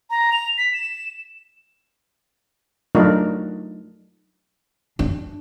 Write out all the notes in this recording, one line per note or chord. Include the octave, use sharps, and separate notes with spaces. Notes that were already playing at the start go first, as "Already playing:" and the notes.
A#5
F7
B6
E7
F#3 A3 D4 D#4 F4 A#4
D4